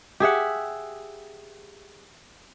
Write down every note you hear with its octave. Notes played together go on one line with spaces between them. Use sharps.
G4 G#4 E5 F#5